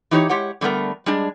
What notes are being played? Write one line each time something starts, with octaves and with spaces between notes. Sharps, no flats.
E3 D#4 G4 C5 C#5
G#3 G4 C#5 F#5
D3 G3 A3 B3 A#4
G3 G#3 D4